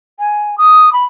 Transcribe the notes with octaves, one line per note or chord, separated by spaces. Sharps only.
G#5
D#6
B5